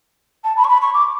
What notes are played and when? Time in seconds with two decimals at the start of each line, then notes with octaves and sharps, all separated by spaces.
0.44 A5
0.57 B5
0.64 C#6
0.69 B5
0.81 C#6
0.94 D6